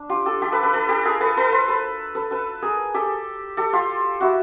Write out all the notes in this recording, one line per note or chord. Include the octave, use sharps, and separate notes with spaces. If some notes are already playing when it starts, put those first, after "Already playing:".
Already playing: D4
F4 G4
G4 A4
G4 A4
A4 B4
A4 B4
A4 B4
G4 A4
G#4 A#4
A4 B4
A4 B4
A#4 C5
A4 B4
A4 B4
A4 B4
G#4 A#4
G4 A4
G4 A4
F4 G4
E4 F#4